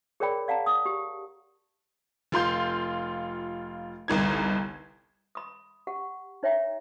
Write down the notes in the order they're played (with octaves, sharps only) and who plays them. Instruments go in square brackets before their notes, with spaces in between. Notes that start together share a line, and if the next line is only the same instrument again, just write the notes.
[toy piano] G#4 A#4 C#5 D5 G5 B5
D5 F5 F#5 A5 A#5
D#6
G4
[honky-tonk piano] F1 F4 C6 G6
G1 C2 D#4 G#6
[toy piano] B5 D#6
G4 F#5
D#4 C#5 E5 G5 A#5